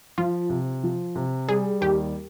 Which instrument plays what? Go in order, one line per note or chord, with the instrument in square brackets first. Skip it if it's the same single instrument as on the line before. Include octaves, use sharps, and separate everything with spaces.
[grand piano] F3 [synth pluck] F4
[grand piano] C3
F3
C3
[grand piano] G3 [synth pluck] G#4
[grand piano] D#2 [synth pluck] G4